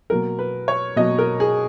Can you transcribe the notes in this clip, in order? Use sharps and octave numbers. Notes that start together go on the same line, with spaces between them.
B2 F#3 A#3 A#4
B4
C#5
B2 F#3 A#3 D#5
A#4
G#4